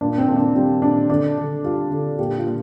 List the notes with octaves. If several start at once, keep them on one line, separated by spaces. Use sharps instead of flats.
A#2 D4
C4
A#2
D4
G3 C4
A#2 D4
D3 D4
D3
G3 F4
D3
A#2 G4
F4
A#2